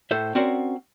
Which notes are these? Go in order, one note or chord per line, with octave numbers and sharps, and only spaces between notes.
A2 A4 C5 E5
C4 C#4 F#4 A#4 C5 D5